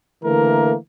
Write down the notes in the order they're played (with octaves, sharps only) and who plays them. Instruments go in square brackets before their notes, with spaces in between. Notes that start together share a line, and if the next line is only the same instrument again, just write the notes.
[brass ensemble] D3 E3 A3 A#3 A#4